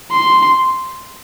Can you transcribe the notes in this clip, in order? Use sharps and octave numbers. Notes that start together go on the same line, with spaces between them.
C6